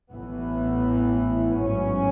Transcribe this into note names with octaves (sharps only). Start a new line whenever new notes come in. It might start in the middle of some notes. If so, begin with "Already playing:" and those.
A1 A2 E3 B3
A1 G#2 F#3 C#4